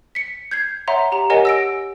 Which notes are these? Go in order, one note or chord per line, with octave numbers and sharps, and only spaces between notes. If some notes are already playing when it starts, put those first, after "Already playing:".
B6 C#7
G6 G#6 C7
C#5 E5 F#5 A#5 C6
G4 A#5
G4 A#4 C#5 D#5 F#5 G#5
E6 A#6 D7